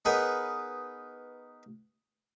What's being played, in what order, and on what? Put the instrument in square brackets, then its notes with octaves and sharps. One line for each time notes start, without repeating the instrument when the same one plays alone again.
[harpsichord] B3 D#4 G#4 A#4 B4 C#5